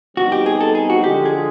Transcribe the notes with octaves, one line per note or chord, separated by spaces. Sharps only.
B2 G3 C4 D#4 F#4
G4
G#4
A4
G#4
F#4
D3 F3 G#3 G4
G#4